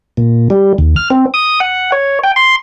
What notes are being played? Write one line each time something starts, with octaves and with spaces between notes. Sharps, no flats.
A#2
G3
D#2
F6
C4
D#6
F#5
C#5
G5
C6